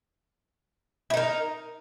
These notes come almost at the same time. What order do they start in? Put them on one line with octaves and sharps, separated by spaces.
E4 D#4 A#4